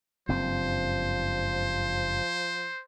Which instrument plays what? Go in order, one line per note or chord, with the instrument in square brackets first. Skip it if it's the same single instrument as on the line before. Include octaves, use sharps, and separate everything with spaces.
[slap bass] F#1 G2 C4 [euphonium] F3 [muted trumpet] C5